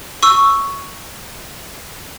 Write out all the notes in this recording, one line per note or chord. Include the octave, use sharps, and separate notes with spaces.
C#6 E6